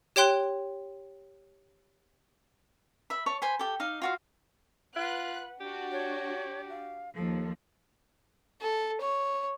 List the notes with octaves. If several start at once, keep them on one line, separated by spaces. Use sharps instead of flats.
G4 C#5 G5 C6 F#6
E5 B5
C#5 A5 C#6
C5 G#5 B5
G4 A4
D#4 F5
F4 F#4 F5
F4 B4 F#5 F#6
D4 F#4 G4
C#5
F5
D#2 F3 A4
A4
C#5